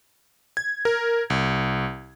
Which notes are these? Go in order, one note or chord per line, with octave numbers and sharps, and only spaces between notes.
G#6
A#4
C2